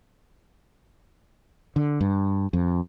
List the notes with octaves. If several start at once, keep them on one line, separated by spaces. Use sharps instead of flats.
D3
G2
F2